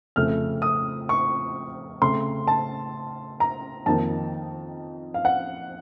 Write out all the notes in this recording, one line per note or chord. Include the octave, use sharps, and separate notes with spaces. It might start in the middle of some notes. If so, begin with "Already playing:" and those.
F2 C#3 A3 F6
D#6
C#6
C#3 A3 C4 C6
A5
A#5
F2 D#3 A#3 D#4 A5
F5
F#5